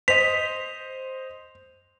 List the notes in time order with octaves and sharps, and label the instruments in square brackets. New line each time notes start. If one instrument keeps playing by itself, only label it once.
[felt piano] C5 D#5 [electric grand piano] B6 [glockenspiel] F7